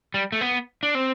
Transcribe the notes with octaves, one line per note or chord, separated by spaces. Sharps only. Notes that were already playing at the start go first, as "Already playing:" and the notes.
G3
A3
B3
D4
C4